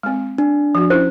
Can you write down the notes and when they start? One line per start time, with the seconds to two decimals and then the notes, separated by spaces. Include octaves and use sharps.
0.03 G#3 C4
0.38 D4
0.75 F3 F#4
0.90 C#4 E4 F4 C5